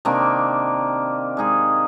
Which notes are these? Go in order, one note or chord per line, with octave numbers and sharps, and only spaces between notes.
C3 D#3 A#3 D4
G#3 D#4 G#4